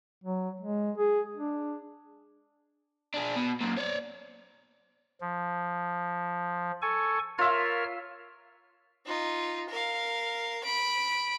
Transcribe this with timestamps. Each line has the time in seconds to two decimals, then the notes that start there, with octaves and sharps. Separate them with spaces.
0.24 F#3
0.61 G#3
0.98 G#4
1.37 D4
3.14 D4 G#4
3.36 B2
3.61 F#2 A#2
3.77 C#5 D5
5.21 F3
6.82 A4 G#5 C#6
7.38 F4 A#4 C#5 E5 F6
9.06 D#4 F4
9.70 A#4 F5
10.64 B5 D7